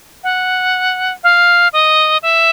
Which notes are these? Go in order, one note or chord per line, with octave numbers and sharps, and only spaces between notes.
F#5
F5
D#5
E5